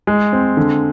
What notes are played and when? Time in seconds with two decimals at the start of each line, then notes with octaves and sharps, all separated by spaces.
0.07 G#3
0.33 C4
0.57 D3